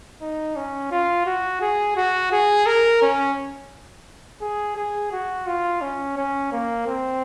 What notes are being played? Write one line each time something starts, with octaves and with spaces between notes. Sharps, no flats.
D#4
C#4
F4
F#4
G#4
F#4
G#4
A#4
C#4
G#4
G#4
F#4
F4
C#4
C#4
A#3
C4